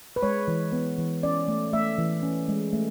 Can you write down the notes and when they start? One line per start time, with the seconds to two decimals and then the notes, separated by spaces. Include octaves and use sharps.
0.16 B4
0.23 G#3 C#5
0.48 E3
0.73 B3
0.98 E3
1.23 C#4 D5
1.48 A3
1.73 A3 E5
1.98 E3
2.23 C#4
2.48 G#3
2.73 A3